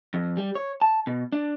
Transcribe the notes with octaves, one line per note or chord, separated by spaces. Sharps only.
F2
G3
C#5
A5
B2
D4